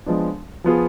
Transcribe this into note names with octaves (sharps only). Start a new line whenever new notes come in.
F3 G#3 B3 D4
F3 B3 F4 G#4